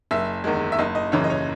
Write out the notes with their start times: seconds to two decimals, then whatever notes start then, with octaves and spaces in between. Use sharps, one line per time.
0.11 F#1 E5
0.44 E2 D#3 G#3
0.72 E5
0.79 F#1 D#5
0.95 D#5
1.12 F#2 C#3 E3 C#5
1.24 D#5
1.30 C#5